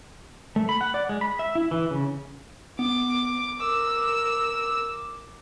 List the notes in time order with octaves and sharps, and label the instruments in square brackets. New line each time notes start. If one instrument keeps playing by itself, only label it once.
[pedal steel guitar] A3
B5
F#5
D5
G#3
B5
E5
E4
E3
C#3
[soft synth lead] B3 [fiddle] D6
[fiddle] A#4 E6 [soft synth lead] D6